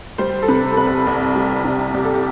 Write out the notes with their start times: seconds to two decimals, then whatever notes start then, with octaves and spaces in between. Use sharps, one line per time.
0.18 G3 C5
0.42 A4
0.48 C3 B4
0.72 A4
0.77 C2 B4
1.07 C2
1.36 G3
1.65 C3
1.94 C2 G4
2.04 A4
2.14 G4